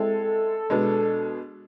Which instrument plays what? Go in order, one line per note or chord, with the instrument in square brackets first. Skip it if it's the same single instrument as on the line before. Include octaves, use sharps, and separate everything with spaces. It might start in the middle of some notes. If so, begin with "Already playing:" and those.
Already playing: [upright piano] G#3 C4 E4 [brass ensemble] A4
[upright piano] B2 G#3 B3 D4